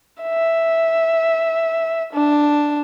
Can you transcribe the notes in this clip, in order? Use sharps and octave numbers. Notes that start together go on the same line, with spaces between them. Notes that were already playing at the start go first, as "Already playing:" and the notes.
E5
D4